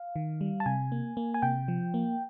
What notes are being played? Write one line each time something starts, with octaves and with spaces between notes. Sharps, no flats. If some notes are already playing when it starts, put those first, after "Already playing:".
Already playing: F5
D#3
G3
A5
C3 G#5
A#3
A#3
G#5
C3 G5
F3
A#3